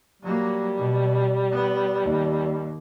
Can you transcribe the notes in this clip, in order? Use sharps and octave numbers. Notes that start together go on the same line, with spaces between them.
F#3 G3 A#3
B2
B3
D#2